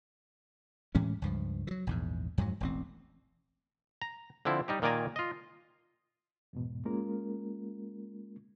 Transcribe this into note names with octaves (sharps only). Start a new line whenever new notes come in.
A2 E3 G#3 C#4
C#2 G2 F3
E3 F#3
A#1 E2 G#2
F2 G#2 F#3
E1 A1 C4
A#5
D3 F3 C4 E4
G3 D#4 G4
A#2 D#3 A#3 D5 G#5 A#5
F4 D#5
E2 G#2 B2
G#3 A#3 C#4 F4 A#4